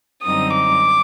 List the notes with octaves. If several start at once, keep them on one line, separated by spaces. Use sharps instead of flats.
F#2 D3 G3 C4 D#4 D#6
D6